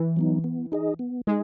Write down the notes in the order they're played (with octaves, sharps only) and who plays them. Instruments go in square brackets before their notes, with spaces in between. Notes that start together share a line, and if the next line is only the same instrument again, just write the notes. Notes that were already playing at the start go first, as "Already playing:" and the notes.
Already playing: [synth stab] E3
[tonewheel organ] F#3 B3 D#4
B3
D#4 G#4 D#5
B3
[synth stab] G#3 [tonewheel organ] D#4 G#4 D#5